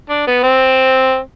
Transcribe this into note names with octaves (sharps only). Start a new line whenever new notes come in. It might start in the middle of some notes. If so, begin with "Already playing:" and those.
D4
B3
C4